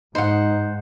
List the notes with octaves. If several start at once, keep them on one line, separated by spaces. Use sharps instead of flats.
G#2 D#4 C5 F#5